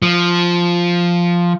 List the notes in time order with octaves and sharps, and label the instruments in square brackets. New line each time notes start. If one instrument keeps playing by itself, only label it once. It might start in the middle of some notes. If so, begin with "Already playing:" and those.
[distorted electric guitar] F3